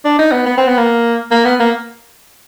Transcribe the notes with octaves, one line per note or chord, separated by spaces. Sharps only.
D4
D#4
B3
B3
C4
B3
A#3
A#3
B3
A#3